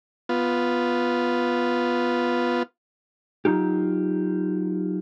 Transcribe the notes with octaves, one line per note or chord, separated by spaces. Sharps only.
B3 F4
F#3 D#4 F4 G4